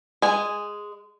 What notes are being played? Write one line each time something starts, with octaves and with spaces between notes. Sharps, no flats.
G#3 G#5